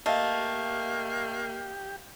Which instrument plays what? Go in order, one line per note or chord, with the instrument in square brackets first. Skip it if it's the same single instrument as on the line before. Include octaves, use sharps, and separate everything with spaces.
[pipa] A3 [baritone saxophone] A#3 [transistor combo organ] G4 [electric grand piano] D#5 F5